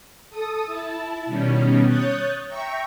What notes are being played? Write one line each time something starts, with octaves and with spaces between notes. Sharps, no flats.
A4 D#6
E4 A5
B2 D#3 G3 C#4
C#5 D#6 F#6 G6 A6
E5 G5 A#5 C#6